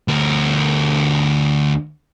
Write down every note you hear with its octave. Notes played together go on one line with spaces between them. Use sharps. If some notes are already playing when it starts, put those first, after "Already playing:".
D2 A#4